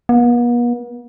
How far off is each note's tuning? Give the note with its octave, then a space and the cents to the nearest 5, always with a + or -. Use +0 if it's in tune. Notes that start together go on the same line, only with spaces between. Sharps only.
B3 -45